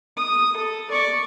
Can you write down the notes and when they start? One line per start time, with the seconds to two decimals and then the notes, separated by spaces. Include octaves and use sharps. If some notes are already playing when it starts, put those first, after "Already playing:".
0.17 D#6
0.57 A4
0.91 D5 C#6